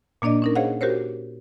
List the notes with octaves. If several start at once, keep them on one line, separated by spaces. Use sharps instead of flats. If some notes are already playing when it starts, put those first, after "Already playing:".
A#2 A#3 D4 D5 D#5
C#4 D#4 A#4
G#4 C5 C#5 D#5 F5 F#5
F#4 G4 A#4 C5 C#5